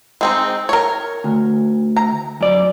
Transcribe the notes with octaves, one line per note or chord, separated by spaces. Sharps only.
G#3 C4 D#4
A#4 C#5
D2
A#5
F#2 D5